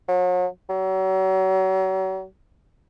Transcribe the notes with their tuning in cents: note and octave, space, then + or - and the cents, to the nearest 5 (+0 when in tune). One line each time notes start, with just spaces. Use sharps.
F#3 -40
F#3 +40